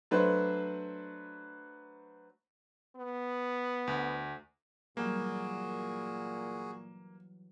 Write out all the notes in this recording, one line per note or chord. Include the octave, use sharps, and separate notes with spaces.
F#3 A3 D4 B4 C5
B3
D2
A#2 E3 F#3 G3 A#3 F#4 G#4